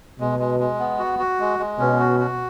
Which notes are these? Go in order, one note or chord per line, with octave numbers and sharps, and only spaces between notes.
B2 G#3
G#3
G#3
B3
F#4
F#4
G#3
G#3
B2 C#4
F#4
F#4